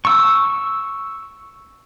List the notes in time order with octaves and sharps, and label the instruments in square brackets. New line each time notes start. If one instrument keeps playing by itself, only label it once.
[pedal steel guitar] C#6 E6